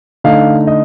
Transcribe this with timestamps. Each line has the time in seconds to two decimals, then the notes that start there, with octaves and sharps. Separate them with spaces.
0.24 D3 A3 D#4 F5
0.67 D#5